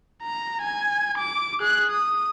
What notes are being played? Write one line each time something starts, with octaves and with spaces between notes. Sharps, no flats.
A#5
G#5
D6
G#4 F#6
D#6